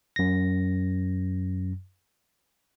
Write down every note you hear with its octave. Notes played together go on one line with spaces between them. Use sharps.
F#2 A#6